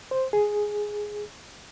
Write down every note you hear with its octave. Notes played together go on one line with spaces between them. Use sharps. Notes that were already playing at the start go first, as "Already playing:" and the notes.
C5
G#4